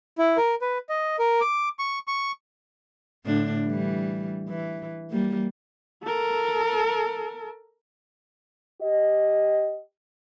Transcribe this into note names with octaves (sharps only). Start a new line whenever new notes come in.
E4
A#4
B4
D#5
A#4
D6
C#6
C#6
A2 D3 D4
E3 G3
E3
G3 A#3
A4 A#4
G4 D#5